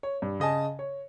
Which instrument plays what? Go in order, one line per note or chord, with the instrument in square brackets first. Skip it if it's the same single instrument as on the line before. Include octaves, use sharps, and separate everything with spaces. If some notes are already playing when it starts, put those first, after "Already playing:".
[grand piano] C#5
G2
C#3 D#5 G#5 A5
C#5